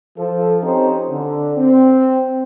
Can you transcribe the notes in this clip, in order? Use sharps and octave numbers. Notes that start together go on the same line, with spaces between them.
F3 A4
F3 C4 C#4 D#4 G4 C5
D3
C4